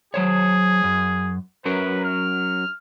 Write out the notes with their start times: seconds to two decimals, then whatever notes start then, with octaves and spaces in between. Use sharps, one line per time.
0.14 F#3 G#4 C5 C#5
0.84 F#2
1.65 F#3 C#4 A#4 B4
2.04 F6